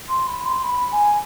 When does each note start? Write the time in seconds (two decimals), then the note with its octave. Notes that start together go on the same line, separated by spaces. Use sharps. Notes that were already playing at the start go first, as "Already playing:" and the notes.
0.09 C6
0.28 B5
0.45 C6
0.64 B5
0.92 G#5